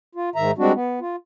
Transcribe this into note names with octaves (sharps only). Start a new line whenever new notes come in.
F4
G#2 D#3 E5 A#5
G3 G#3 C4 D4 F#4
B3
F4